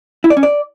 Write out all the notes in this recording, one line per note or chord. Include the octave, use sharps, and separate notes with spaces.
E4
D5
C#4
D5